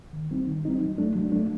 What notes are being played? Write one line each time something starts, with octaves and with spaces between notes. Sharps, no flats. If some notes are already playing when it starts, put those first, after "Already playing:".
D#3
G3 C4 D#4
D#3
G3 C4 D#4
F#3
A3 D4
F#3
A3 D4